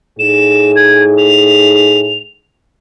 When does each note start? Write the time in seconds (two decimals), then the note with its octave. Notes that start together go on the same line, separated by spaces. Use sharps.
0.19 A2 D#4 G#4 E7
0.76 G#6
1.17 F7